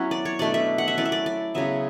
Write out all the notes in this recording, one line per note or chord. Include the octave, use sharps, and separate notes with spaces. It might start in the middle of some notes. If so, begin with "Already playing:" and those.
Already playing: F#3 B3 C#4 E4 F#5
D5
C#5
B2 A3 D4 D5
E5
F#5
E5
F#3 C#4 E4 D5
E5
D5
D5
C#3 F#3 B3 E5